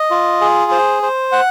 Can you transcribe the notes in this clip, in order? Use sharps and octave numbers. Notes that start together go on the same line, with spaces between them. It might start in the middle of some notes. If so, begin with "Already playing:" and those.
Already playing: D#5
F4
G#4
C5
C5
F#5